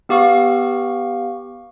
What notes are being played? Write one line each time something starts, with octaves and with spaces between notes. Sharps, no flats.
B3 G4 F5 C#6